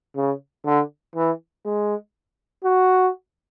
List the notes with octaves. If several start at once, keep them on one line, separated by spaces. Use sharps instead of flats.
C#3
D3
E3
G#3
F#4